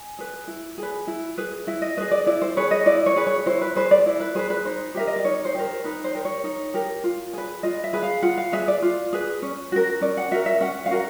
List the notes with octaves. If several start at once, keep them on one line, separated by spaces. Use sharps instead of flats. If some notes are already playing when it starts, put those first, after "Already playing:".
Already playing: G#5
G#4 B4
E4
G#4
B4
E4
G#4 B4
E4 E5
D#5
G#4 B4 D#5
D5
E4 D5
C5
G#4 B4 C#5
D#5
E4 D5
C#5
G#4 B4
C#5
E4 C5
B4
G#4 B4 C5
D5
E4
B4
G#4 B4 C5
B4
D#4 C5
G4 A#4 E5
D#5
D5
D#4 C#5
C5
G4 A#4
C5
D#4 B4
C5
G4 A#4
C#5
D#4
G4 A#4
F4
G#4 B4
F4 D#5
E5
G#4 B4
F5
F4 F#5
F5
G#4 B4 E5
D5
F4
G#4 B4
C#4
F#4 A#4
C#4 D5
F#5
F#4 A#4 E5
E5
C#4 F#5
F5
F#4 A#4 F#5